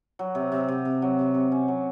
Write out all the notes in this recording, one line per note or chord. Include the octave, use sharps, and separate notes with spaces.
F#3
C3
C3
C3
C3
F#3
C3
C3
C#4
F#3